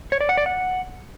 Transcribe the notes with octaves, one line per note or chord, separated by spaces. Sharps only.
C#5
D5
F#5
D5
F#5